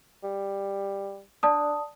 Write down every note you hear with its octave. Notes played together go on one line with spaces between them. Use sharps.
G3
D4 D5 A5 D#6